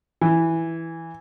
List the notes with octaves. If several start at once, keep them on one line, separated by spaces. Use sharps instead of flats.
E3